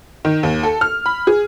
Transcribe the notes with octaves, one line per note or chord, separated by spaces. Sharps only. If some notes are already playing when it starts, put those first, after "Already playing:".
D#3
D#2
A4
F6
B5
G#4